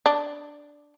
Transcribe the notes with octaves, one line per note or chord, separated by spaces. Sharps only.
D4